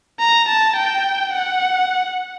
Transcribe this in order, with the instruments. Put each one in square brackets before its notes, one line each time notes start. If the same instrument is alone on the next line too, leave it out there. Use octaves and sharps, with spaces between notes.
[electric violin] A#5
A5
G5
F#5